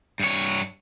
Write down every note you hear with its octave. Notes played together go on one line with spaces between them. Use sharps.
G2 C#5